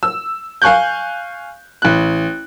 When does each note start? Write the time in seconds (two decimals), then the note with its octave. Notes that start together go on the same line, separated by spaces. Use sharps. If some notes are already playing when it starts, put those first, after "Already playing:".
0.03 E6
0.62 F5 G#5 C#6 F#6 G6
1.82 A1 F#6